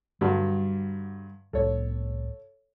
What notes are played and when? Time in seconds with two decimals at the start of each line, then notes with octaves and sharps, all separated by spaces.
0.21 G2 D3 F#3 G3
1.53 C2 A2 A4 C#5